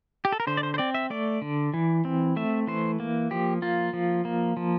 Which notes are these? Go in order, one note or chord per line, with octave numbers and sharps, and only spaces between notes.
G4
A4
A#4
D3 C5
D5
C5
C5
C4 D5
E5
A3 D5
D3
E3
C4
A3 E5
E3 C5
A#3
F3 G4
A#3 F4
F3
A#3
F3